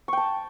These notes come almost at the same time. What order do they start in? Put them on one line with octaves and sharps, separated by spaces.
C#6 G5 A5